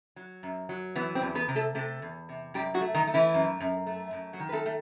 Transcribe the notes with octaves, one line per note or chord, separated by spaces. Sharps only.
F#3
F#2
F#3
E3 B3
C4
E2
B3 B4
C3
A3 A4
C3 A3 A4
E2
C3
F#2 G3 G4
F#3 F#4
A3
D#3 D#4
A3
E3 E4
F#2
F#2
A3
F#2
F#3 F#4
D#3
B4
A3 A4
A3